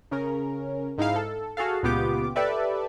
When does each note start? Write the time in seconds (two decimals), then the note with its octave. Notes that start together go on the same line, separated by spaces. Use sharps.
0.11 C#3 C#4 A#4
0.98 G#2 D#4 E4 F5
1.16 A4
1.57 F#4 G#4 A4 F5
1.83 C#2 A#2 B3 F4 G4 D6
2.36 G4 A4 B4 D5 E5